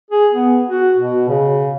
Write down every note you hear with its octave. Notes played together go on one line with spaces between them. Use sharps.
G#4
B3
F#4
B2
C#3